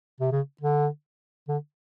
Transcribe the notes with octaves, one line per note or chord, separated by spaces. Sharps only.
C3
C#3
D3
D3